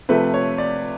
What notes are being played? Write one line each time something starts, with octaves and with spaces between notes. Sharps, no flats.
C3 F3 A3 B4
C#5
D5